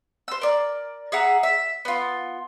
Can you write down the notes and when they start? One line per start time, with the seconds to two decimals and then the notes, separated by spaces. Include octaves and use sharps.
0.28 C5 E6
0.41 A#4 D5
1.12 G#4 E5 F#5 A#5
1.43 E5
1.85 B3 F4